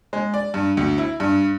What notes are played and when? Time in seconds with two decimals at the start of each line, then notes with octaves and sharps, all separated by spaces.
0.13 G#3
0.34 D5
0.54 G2
0.77 D2
0.98 E4
1.20 G2